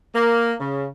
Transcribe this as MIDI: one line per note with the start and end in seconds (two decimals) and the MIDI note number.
0.14 0.53 58
0.60 0.86 49